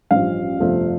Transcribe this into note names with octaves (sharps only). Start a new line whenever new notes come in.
A1 G2 F3 F5
G1 F2 C3 F3 A3